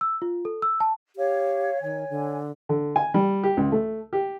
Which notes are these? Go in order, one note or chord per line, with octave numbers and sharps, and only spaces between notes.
E6
F4
A4
E6
A5
G4 C#5 F5
D#3 C#5 G#5
D3
D3
G#5
G3
G4
C#2
A3
G4